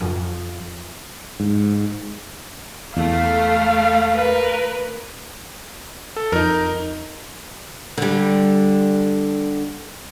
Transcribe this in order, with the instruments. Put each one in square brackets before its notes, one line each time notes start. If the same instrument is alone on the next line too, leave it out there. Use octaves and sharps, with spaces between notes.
[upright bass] F2
[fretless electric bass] G#2
[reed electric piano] E2 [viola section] A3 [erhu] F5
[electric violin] A#4 B4
[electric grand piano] A4
[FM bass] F2 [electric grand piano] D#4 A#4
[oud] D3 G3